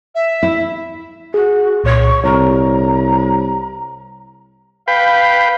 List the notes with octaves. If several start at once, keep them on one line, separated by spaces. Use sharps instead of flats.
E5
E4
F#4 G#4
C2 A#2 C#5 C#6
C2 C#5 A#5
B4 F5 G5